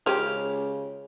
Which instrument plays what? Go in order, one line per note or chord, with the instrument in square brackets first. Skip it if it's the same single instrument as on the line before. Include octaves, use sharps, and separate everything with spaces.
[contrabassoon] C#2 [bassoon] C#3 [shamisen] C#4 G#4 C5 [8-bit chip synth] G4 F6